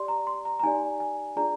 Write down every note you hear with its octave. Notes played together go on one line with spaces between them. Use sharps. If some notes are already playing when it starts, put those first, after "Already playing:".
Already playing: G4 D5 C6
A#5
C6
A#5
A#5
D#4 G4 D5 G#5
G#5
D4 F4 G#4 D5 A#5